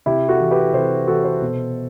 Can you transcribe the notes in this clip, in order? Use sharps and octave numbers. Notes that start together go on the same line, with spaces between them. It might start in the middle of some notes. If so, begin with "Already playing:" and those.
C3 E4 G4
F#4 A4
E3
G4 B4
C3 A4 C5
E3 F#4 A4
A4 C5
B2